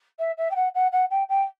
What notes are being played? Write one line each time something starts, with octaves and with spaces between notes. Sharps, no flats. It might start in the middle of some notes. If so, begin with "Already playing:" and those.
E5
E5
G5
F#5
F#5
F#5
G5
G5